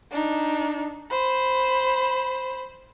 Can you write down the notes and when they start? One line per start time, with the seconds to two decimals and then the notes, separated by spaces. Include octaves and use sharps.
0.11 D4 D#4
1.10 C5 B5